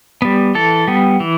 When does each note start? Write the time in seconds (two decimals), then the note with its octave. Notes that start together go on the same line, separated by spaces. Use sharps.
0.22 G3 B3
0.55 E3 A4
0.87 G3 B3
1.20 E3